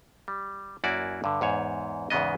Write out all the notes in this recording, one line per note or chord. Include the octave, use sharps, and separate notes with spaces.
G3
F#2 A#3 E4 F#4 D5
G2 D3
E2 G#2 C#5
E2 G#2 C#3 B3 D#5